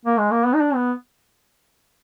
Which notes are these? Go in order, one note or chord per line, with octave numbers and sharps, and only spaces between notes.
A#3
G#3
A#3
B3
D#4
D4
B3